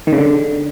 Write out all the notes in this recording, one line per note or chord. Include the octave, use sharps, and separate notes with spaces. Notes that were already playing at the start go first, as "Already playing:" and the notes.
D#3
C#3
D3